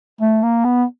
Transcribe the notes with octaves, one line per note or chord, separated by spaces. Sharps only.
A3
A#3
B3